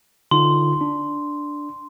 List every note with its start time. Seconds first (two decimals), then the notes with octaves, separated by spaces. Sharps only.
0.31 D3 D#4 F4 C6
0.81 D4